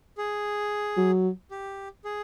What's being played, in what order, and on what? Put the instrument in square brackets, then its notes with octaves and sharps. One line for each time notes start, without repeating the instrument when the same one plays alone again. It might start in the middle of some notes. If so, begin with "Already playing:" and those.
[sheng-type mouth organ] G#4
[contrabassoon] F#3
[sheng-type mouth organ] G4
G#4